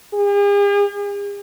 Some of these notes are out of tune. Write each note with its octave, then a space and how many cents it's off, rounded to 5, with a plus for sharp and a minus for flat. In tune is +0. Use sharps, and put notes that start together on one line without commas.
G#4 -45